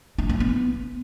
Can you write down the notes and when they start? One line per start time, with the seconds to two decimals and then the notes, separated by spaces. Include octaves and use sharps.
0.18 D4
0.29 C#4
0.40 B3